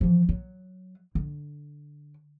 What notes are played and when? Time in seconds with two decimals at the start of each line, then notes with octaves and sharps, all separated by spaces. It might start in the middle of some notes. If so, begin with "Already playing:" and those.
0.01 E3 F3
0.29 F#3
1.15 D3